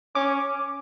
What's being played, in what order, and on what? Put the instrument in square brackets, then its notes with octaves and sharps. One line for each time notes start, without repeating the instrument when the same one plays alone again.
[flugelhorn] C#4 [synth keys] D6